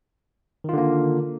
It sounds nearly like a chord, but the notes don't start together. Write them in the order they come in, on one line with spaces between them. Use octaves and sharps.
D#3 F4 D3 A#3